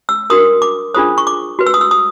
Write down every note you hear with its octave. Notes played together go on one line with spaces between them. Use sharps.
E6
D4 F#4 A#4 D#6
D6
D4 F4 G#4 C5 D#6
C#6
D6
F#4 B4
E6
D#6
E6
D#6